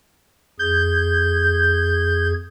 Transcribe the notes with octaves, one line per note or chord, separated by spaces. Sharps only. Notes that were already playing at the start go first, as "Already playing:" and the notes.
F2 G#4 G6 G#6